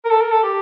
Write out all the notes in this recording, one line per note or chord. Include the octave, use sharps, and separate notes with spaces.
A#4
A4
A#4
A4
G4